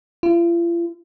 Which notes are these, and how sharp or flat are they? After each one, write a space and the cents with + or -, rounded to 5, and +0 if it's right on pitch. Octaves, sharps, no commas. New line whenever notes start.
F4 -45